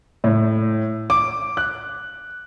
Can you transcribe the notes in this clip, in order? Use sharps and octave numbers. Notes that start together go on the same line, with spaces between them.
A2
D6
F#6